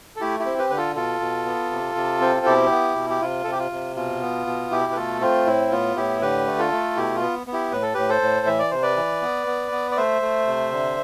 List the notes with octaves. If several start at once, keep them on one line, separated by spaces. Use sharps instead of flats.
A4
A3 E4 G4
E4 G4
C4
G4 B4
D3 B4
F4 A4
B2 F4 A4
B2
B3
C3
C3
C4
F4
B2 E4 G4
B3
B2
G4
C3 F4
C3 A4
G4
F4
C3
B2 F4
B3
B2
B2 E4 G4
B4
A3 F4 A4
C4 F4
A2 E4
B3 F4
A2 E4 G4
D3 G4 B4
A3
F4 A4
A3
B2 E4 G4
F4
B3
B3
E4 G4
A2 B4
A4
A2 G4 B4
A4 C5
A2
E3 E5
D5
C3 C5
B4 D5
E3
B3
B3
B3
D5
A3 C5 E5
A3
C3
D3